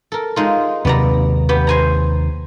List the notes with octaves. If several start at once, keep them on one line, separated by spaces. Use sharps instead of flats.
A4 A#4
G#3 D#4 F4
D#2 C3 D#3 B3 D5 A#5
B3 G4
C5 G#5 A#5